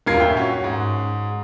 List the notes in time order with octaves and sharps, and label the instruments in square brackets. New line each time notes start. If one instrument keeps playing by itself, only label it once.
[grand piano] D#1 F#2 F4 A#4 G#6 C7
E5 G5
C#4 F#4
G#2